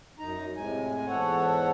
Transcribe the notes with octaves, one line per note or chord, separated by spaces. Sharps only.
F#2 D#4 A#5
A2 C3 G#3 G#5
E2 G#2 A4 C#5 F#5